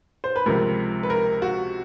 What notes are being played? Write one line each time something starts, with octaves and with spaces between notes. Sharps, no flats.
C5
B4
C#2 C3 F3 A#4
B4
A#4
F#4